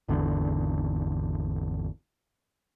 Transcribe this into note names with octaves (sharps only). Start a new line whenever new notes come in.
G#1 E2 D3